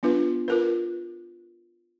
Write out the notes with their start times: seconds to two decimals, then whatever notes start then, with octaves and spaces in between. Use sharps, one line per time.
0.03 B3 D4 F4 B4
0.48 F4 A#4 B4